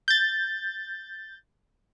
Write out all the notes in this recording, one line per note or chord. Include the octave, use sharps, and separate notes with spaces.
G6 A6